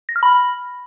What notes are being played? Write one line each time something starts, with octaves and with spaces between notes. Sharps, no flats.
A#6
F6
B5